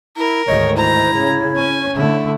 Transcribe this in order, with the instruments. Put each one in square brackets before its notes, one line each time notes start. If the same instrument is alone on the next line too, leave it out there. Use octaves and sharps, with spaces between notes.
[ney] E4 [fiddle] A#4
[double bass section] D2 G#2 D#3 [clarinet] C#5 [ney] D#5
[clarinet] E4 [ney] C5 [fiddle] A#5
[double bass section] C#3 [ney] C#5
[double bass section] C#4 [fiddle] G#5
[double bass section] D3 A3 [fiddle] E4